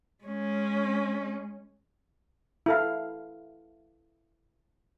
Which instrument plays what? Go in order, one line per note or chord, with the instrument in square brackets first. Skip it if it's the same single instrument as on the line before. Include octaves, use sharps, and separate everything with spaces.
[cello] G#3 C#4
[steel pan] E4 A4 F5